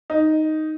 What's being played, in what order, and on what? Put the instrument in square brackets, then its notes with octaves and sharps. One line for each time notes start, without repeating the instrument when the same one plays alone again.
[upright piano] D#4